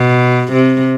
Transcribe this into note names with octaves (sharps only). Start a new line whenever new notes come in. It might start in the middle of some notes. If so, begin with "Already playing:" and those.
Already playing: B2
C3